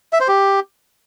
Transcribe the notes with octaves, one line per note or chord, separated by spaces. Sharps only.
E5
C5
G4